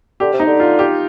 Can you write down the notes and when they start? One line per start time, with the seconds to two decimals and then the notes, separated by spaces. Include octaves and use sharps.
0.20 D3 G4
0.33 C3
0.40 D#4
0.47 D3
0.60 F4
0.79 G4